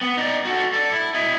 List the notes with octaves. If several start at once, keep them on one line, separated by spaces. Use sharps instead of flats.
B3
D#4 D5
F#4 A4
A4 D5
E4
E4 D#5